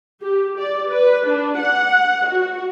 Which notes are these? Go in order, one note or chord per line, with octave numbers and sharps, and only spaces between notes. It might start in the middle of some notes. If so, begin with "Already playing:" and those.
G4
D5
B4
D4
F#5
F#4